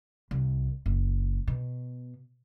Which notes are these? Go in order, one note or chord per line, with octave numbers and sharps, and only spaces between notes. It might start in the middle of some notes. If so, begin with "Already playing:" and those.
C2
F#1
B2